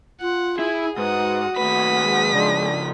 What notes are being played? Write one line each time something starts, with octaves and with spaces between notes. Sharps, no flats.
F4 F#5
E4 G#4
G#2 F#4 B4 F#5 D#6
D#2 A3 B4 D#6 B6
G#3
C#3 F3 D4